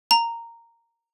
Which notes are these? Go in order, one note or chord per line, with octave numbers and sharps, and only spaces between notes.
A#5